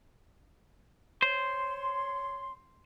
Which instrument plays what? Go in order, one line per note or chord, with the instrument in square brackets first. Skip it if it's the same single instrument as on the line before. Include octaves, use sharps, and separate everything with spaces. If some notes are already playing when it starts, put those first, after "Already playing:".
[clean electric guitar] C5 [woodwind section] C#5 C6